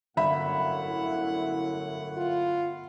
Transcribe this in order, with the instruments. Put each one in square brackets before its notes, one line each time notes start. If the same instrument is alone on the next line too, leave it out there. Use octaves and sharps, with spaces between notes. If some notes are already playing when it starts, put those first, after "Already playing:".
[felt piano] G1 E5 B5 [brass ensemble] F#2 A2 F#5
[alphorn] E4
F4